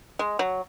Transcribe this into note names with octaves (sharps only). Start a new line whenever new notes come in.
G#3
F#3